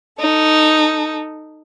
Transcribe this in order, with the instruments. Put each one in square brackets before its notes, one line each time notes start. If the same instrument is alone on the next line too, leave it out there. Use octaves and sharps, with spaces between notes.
[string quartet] D#4 A4